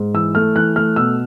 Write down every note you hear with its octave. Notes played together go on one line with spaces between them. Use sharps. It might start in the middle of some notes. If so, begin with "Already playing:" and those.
Already playing: G#2
E3 E6
A3 F6
E3 F#6
A3 F6
B2 E6